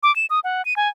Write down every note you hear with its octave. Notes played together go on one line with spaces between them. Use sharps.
D6
E7
D#6
F#5
D#7
G#5